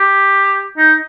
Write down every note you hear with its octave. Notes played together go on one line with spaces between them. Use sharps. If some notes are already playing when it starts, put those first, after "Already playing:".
Already playing: G4
D#4